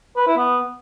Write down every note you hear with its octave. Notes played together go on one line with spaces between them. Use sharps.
B4
E4
B3